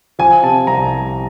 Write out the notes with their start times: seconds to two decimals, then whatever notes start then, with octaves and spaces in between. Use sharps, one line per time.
0.19 F3 G#5
0.43 C3 A5
0.67 C2 A#5